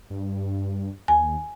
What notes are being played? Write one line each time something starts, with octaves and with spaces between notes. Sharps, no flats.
G2
D#2 G#5